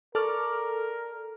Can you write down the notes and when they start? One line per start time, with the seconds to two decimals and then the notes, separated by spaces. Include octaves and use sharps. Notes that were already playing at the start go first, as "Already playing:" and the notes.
0.15 A4 A#4 D5 C#6 F6